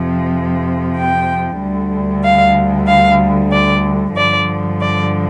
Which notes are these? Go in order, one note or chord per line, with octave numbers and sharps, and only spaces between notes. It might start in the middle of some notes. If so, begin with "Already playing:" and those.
Already playing: F2 C3 F3
G5
D2 D3 G3
F5
F5
D5
G2 D3 F3 D5
D5